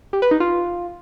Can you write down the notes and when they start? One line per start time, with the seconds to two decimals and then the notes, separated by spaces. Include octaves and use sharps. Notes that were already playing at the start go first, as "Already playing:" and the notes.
0.13 G4
0.22 B4
0.31 D#4
0.40 F4